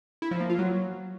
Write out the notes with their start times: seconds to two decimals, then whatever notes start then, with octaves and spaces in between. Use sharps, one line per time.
0.22 E4
0.31 F3
0.40 A#3
0.50 F4
0.59 F#3